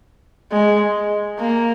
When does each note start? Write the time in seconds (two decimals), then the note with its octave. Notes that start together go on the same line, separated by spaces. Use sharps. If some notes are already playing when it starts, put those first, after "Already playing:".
0.52 G#3
1.40 A#3